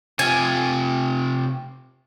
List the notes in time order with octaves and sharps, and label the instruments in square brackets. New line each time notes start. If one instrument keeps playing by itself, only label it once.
[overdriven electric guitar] C3 F4 [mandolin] G#5